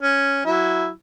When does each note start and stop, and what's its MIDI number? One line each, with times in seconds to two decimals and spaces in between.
0.02 0.41 61
0.45 0.89 54
0.45 0.89 64